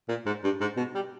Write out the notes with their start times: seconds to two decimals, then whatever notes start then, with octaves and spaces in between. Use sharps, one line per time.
0.09 A#2
0.26 G#2
0.44 G2
0.61 G#2
0.77 B2
0.95 G3